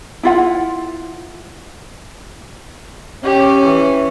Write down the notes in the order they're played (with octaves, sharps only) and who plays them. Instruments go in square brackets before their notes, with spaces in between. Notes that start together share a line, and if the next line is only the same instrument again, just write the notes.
[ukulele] E4 F4 F#5
[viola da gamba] C#4 [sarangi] G4
[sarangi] E3